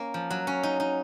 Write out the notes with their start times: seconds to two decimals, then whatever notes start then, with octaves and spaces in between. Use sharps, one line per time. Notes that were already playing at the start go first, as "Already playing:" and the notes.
Already playing: A#3 C#4 D#4
0.14 F3
0.30 F#3
0.47 C#4
0.63 D#4
0.80 D#4